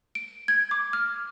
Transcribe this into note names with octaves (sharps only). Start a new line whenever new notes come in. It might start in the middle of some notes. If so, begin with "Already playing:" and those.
D7
G#6
D6
F6